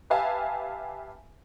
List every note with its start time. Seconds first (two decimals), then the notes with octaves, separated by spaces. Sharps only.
0.10 G4 B4 E5 F5 G#5 A5